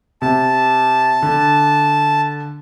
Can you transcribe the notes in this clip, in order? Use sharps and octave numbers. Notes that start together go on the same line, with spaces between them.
C3 A5
D3